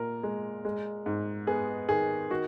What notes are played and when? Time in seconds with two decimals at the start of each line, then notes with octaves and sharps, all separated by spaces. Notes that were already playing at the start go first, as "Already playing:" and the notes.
Already playing: A#2 A#4
0.23 G#3
0.65 G#3
1.06 G#2
1.47 B3 G#4
1.89 D#3 G#4
2.30 D#3 F#4